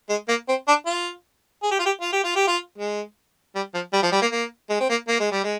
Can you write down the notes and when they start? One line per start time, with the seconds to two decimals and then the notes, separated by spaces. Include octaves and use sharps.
0.09 G#3
0.28 A#3
0.48 C4
0.67 D4
0.86 F4
1.63 G#4
1.71 G4
1.79 F4
1.85 G4
2.01 F4
2.12 G4
2.24 F4
2.36 G4
2.47 F4
2.78 G#3
3.55 G3
3.74 F3
3.93 G3
4.02 F3
4.12 G3
4.21 A#3
4.32 A#3
4.69 G#3
4.80 C4
4.89 A#3
5.08 A#3
5.20 G#3
5.31 G3
5.43 G#3